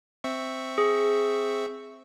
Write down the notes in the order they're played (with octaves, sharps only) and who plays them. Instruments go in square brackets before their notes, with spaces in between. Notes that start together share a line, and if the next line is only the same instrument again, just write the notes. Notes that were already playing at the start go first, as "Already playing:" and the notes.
[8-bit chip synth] C4 E5 C#6
[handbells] G#4